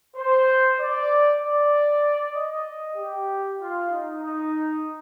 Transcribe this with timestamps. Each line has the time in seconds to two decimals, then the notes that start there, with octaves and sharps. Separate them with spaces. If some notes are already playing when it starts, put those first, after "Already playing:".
0.16 C5
0.79 D5
1.41 D5
2.34 D#5
2.96 G4
3.59 F4
3.90 D#4
4.21 D#4